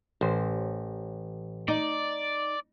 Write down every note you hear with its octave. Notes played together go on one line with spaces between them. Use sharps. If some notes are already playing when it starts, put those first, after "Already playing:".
A1 C5
D#4 D5